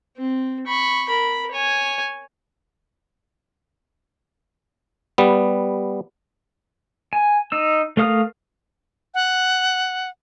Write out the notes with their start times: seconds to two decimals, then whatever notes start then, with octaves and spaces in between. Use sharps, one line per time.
0.17 C4
0.67 B5 C#6
1.09 A#4 B5
1.52 C#5 G#5
5.18 G3 B3
7.13 G#5
7.52 D#4 E6
7.97 A3 A#4 F5 D#6 F6
9.14 F#5